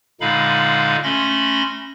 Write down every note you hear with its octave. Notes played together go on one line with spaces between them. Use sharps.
A#2 D3 G#3 D#4 F5 B5
A3 C#4 B5 C6 A#6